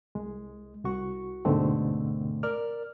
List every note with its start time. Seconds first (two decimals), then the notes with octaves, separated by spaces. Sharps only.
0.15 C2 G#3
0.85 C2 F#4 C#6
1.45 D2 G#2 B2 D3 A3 C4
2.43 A#4 D5 F6